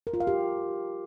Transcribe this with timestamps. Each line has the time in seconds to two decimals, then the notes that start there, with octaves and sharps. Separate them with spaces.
0.07 A#4
0.14 F4
0.20 F5
0.27 G4